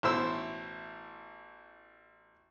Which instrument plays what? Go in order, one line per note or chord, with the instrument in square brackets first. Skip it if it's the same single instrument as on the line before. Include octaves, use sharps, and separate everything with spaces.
[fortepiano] A1 B2 E4 C5 E6